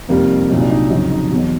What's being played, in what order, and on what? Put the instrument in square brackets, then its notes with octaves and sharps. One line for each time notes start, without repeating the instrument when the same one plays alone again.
[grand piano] F2 C3 D#3 G3 A#3
C2 A#2 F#3 D#4
D4
D#4
F2 C#3 F#3 D#4
D#4
E2 B2 F#3